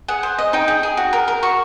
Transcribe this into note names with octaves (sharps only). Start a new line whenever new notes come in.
G#4 F#5
C5
D#5
D#4 G5
G#4
G#4
F#4
A#4
A#4
F#4 C#6